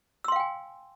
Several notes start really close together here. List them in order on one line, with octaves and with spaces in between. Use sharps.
E6 C6 F5 G5 G#5